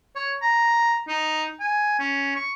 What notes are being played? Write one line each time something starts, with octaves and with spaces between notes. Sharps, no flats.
C#5
A#5
D#4
G#5
C#4
C#6